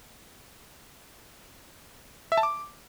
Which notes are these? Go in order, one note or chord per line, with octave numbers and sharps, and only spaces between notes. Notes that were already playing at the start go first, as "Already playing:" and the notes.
E5
A5
D6